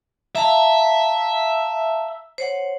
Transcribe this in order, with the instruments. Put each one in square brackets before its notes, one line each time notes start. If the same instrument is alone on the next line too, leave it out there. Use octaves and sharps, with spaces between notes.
[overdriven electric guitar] E5 [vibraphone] F5 A5 A#5
[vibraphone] C5 C#5 F#5